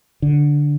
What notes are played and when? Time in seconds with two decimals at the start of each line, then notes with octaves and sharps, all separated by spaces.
0.22 D3